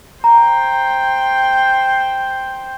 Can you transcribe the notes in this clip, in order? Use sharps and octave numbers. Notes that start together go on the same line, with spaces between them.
C5 G5 A#5